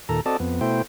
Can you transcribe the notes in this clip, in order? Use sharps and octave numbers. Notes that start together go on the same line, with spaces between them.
D#2 A#2 A4 A#5
C4 F#4 A4 D5 D#5 A5
F2 B3
B2 A3 E4 C5 G5